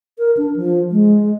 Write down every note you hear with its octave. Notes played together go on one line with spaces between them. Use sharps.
A#4
D4
F3
G#3